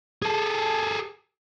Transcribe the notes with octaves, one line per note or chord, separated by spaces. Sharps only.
G#4 A4